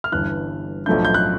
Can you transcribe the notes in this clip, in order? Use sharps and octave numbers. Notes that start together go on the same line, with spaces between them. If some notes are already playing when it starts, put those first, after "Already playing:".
F6
G1 G2 E3 F#6
B1 A2 F3 A3 D4 G6
G6
F#6